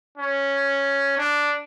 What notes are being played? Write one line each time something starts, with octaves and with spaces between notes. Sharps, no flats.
C#4
D4